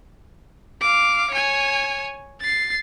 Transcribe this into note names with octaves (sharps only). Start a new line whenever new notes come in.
F5 D6
C#5 G#5
A6 C7